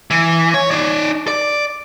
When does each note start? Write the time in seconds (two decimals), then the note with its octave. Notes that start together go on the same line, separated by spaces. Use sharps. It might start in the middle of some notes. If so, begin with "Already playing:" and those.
0.11 E3
0.54 C#5
0.71 D#4 D5
1.28 D5